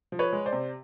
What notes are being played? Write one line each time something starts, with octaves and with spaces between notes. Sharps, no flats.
F3
B4 C#5
G#3
C5 D5
C3